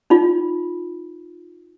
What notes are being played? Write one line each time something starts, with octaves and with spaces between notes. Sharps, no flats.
D#4 F4